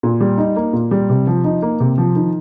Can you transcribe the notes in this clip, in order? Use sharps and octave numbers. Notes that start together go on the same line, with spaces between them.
A#2
G3
D#4
A#3
A#2
G3
C3
F3
D#4
A#3
C3
F3
D#3